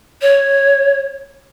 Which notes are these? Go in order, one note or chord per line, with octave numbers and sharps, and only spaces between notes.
C#5